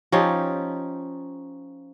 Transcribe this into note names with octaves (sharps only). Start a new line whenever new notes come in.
F3 C#4 D#4 G4